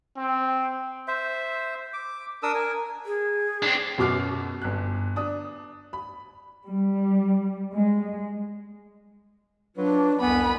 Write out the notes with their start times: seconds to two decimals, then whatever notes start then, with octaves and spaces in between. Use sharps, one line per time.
0.17 C4
1.08 C5 E5
1.93 D6
2.43 D4 A#4 D#6 E6
2.54 A#4 G#5
3.06 G#4
3.62 C4 D4
3.98 F#2 B2 F#4 D6 F6 C7
4.62 G1 F#6
5.16 D4 D#6
5.93 B5
6.65 G3
7.73 G#3
9.76 F#3 D4 F4 B4
10.21 C2 F2 B3 G#5 B5